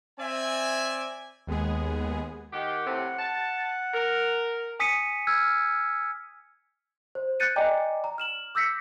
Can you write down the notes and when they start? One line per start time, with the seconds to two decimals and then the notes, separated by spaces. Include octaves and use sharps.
0.19 C4 D5 E5 G#5
1.47 D#2 G#3 B3 G#4
2.53 D#3 G4 F#5
2.85 A2 C3
3.18 A5
3.94 A#4
4.80 G#5 D#6 B6 C#7 D#7
5.27 E6 F6 G#6
7.15 C5
7.40 F#6 G6 A6 C#7 D#7
7.56 D5 D#5 G5 G#5 A#5 D6
8.04 A#5
8.18 F6 E7 F#7
8.55 D6 E6 G6 A#6 B6 C#7